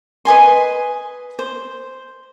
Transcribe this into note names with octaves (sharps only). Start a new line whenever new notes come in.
B4 D#5 G#5 C6
C5